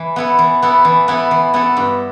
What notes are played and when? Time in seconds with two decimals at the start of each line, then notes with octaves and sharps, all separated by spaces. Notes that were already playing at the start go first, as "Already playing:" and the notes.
Already playing: E3
0.16 B3 E4 A4
0.39 E3
0.62 B3 E4 A4
0.85 E3
1.08 B3 E4 A4
1.31 E3
1.54 B3 E4 A4
1.77 G2